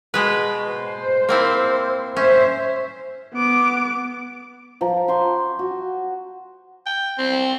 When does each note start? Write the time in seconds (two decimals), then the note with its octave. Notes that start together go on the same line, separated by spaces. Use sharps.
0.14 B2 G#3 B4
0.65 C5
1.29 A#3 C4 E4
2.16 C#4 C5 E5
3.34 B3 D6
4.81 F3 A#5
5.08 G4 C6 C#6
5.59 F#4
6.86 G5
7.18 C4